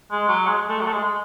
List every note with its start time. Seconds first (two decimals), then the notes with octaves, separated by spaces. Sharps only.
0.11 G#3
0.28 F#3
0.46 G#3
0.57 G#3
0.69 A3
0.80 F#3
0.86 A3
0.92 G#3
1.03 G#3